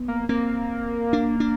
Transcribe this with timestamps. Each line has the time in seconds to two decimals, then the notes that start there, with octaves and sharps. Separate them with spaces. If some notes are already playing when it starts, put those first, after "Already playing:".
Already playing: B3
0.08 A#3
0.29 A#3 C4
1.13 D4
1.40 D4